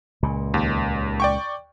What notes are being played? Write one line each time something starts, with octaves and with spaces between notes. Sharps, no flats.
C#2 A#2
D#2
D5 G5 C#6